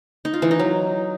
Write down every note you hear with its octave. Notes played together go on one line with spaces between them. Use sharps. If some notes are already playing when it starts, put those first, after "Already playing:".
D#4
F4
E3
D#4
F#3